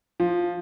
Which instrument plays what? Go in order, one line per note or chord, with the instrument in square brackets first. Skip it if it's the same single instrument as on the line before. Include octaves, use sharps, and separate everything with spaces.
[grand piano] F3